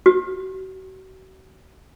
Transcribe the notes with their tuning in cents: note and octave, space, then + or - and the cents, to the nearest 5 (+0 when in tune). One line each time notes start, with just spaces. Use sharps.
F#4 +40